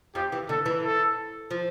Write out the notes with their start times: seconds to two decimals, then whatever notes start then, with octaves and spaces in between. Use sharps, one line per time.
0.15 F2 F3 G4
0.32 E3
0.49 D3 A4
0.66 E3
0.83 A4
1.51 F3